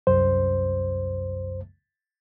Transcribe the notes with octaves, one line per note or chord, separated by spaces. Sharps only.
C2 F#2 C5